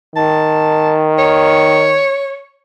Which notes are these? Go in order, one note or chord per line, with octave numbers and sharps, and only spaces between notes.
D#3 A5
C#5